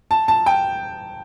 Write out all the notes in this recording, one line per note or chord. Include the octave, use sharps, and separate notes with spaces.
A5
A5
G5